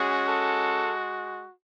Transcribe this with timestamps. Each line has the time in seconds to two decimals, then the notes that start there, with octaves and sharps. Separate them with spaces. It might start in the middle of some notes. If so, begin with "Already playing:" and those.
Already playing: G#3 C#4 F#4 G#4
0.28 A4